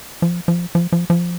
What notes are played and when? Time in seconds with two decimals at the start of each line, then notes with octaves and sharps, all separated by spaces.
0.22 F3
0.48 F3
0.75 F3
0.92 F3
1.10 F3